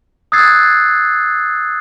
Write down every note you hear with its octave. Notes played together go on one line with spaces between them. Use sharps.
D#6 E6 F#6 G#6 A6 C7